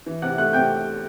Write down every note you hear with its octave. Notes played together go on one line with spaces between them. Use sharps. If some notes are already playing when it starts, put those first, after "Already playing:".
E3
C3 F#5 F#6
A3 F#5 F#6
C3 G5 G6